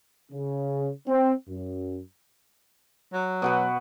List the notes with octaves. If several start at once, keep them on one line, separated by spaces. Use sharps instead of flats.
C#3
C4
F#2
F#3
B2 F#4 B4